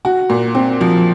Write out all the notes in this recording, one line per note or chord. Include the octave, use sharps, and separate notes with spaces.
F#4
A#2
C4
F3